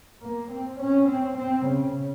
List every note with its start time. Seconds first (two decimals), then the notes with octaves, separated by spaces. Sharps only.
0.22 A#3
0.51 C4
0.80 C#4
1.08 C4
1.37 C4
1.66 C#3